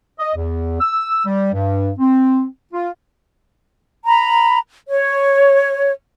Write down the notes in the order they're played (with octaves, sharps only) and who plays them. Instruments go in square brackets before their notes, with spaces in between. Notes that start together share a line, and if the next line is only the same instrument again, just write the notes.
[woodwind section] D#5
E2
E6
G3
G2
C4
F4
[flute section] A#5 B5
C#5